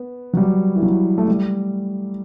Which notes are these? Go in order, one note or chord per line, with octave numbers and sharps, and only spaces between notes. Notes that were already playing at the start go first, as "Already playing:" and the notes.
Already playing: B3
F#3
G3
E3
F#3
A3
G3